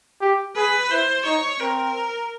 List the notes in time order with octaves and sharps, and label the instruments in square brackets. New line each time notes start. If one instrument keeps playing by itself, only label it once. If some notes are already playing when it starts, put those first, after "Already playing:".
[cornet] G4
[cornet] G#4 [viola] B4
[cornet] E4 [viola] C5
[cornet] D#4 [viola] C#5
[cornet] C4 [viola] A#4